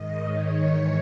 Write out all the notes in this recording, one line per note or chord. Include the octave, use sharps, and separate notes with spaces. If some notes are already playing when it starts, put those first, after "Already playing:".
Already playing: G#2 D#3 D#5
C#5
G#2 E3